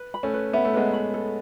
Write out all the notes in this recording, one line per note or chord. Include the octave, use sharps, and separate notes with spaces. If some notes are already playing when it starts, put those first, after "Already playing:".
Already playing: B4
B5
A3 C#4
B4
B3 E5
A3
G#3 B3 B4
B5
A4